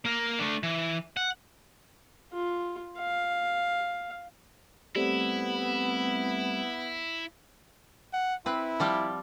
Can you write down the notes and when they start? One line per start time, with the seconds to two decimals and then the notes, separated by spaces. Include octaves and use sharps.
0.05 A#3 A#4
0.39 A3 D4
0.63 E3
1.17 F#5
2.33 F4
2.98 F5
4.96 G3 A3 B3 C4 E4
8.13 F#5
8.46 C4 E4 B4
8.80 F3 G3 G4